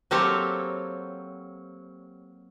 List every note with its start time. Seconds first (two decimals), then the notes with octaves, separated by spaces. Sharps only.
0.11 F#3 A#3 C4 G4 A4 C#5